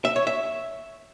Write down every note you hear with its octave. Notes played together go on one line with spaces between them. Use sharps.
E5
C#5
E5